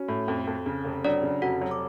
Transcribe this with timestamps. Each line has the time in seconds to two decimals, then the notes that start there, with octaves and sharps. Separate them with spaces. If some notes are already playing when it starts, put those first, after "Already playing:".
Already playing: C#4 F#4
0.08 A2
0.28 F2
0.47 F2
0.66 C#3
0.85 F1
1.05 F#3 D4 D5
1.23 C#3
1.42 F1 F#4 F#5
1.61 F#3
1.71 D6